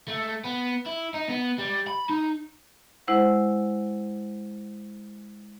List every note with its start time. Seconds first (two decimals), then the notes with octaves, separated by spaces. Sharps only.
0.08 A3
0.45 B3
0.87 E4
1.14 D#4
1.29 B3
1.58 G3
1.87 B5
2.10 D#4
3.08 G#3 E4 C5 F#5